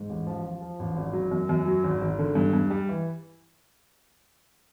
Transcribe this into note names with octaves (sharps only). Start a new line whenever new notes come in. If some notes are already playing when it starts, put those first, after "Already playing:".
Already playing: G#2
A1
F3
F3
F3
A1
G#1
F#3
F#2
F#2
F#3
G#1
G#1
D3
G2
G2
G3
E3